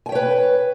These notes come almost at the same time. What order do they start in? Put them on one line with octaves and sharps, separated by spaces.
G#5 G5 C#5 B4